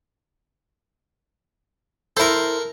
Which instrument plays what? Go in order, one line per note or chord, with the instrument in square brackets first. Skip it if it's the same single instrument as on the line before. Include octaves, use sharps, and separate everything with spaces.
[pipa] E4 C5 [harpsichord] A4 A#4